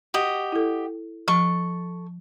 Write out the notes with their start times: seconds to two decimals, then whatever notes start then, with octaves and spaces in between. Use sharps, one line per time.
0.14 F#4 G4 D#5
0.52 E4 A4
1.28 F3 A4 C#6